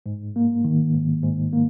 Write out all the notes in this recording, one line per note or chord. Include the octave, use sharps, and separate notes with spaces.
G#2
A#3
D#3
G#2
G#2
A#3